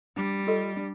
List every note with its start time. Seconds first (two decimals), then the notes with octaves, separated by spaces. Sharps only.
0.16 G3 D4
0.47 F4 A4 D#5
0.76 D4